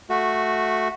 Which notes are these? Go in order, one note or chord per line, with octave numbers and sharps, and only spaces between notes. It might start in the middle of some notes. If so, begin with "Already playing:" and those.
A3 F#4